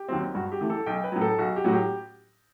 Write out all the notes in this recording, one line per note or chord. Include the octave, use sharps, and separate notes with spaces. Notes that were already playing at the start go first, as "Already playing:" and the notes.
Already playing: G4
D#2 D#3 F#3 C4
G2 F#4
G4
E3 A3
A4
B1 G5
B4
A2 F#3
A4
B1 F#4
G4
A2 F#3 F#4
G4